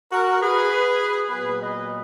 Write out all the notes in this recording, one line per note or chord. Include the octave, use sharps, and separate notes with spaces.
F#4 A#4
G#4 B4
A#2 F#3 B3 G#4 B4
B4 D#5